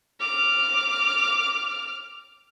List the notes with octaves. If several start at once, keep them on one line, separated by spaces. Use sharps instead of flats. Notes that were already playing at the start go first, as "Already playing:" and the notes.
D6 F6